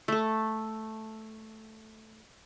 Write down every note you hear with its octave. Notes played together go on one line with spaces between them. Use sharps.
A3 A4